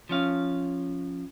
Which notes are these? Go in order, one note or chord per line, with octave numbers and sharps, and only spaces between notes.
F3 C#4 F5